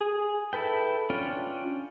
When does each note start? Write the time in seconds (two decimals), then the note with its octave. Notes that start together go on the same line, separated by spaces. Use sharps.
0.01 G#4
0.53 E4 A4 B4 G5
1.10 C#4 D4 F4 G5